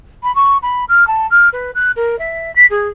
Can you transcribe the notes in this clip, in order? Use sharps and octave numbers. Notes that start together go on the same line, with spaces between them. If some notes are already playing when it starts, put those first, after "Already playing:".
B5
C#6
B5
F6
A5
F6
B4
F#6
A#4
E5
B6
G#4